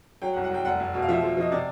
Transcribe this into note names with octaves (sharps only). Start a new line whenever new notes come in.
F#3 G5
F#5
C2
F#5
C2 G5
F1 F#5
F1
B2
F5
F3 E5
F3
F3 D#5
C3 D5